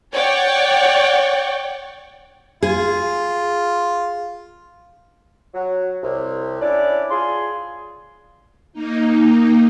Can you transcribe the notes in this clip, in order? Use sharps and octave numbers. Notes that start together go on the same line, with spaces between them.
C#5 D5 F#5 G5 C#6
F4 G#4
F#3
C2
C#4 D4 E4 D5
F4 G#4 C6
A#3 D#4